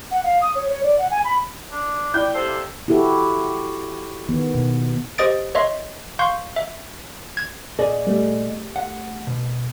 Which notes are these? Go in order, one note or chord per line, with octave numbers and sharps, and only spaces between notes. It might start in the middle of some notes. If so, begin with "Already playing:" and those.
F#5
F5
D#6
C#5
C#5
D5
F#5
G#5
B5
D4
E4 D5 G5 G6
C3 A4 C5 F5
E4 F#4 G4 A4
D#3 B3
B2
G4 C5 D#5 D#6 A6 D7
C#5 D#5 E5 C6
F5 C6 C#6 G6
E5
G#6
A#2 G#4 D5 D#5
G3 A3
F#5
B2